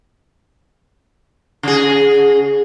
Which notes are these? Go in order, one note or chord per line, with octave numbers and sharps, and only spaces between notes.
C#3 G#4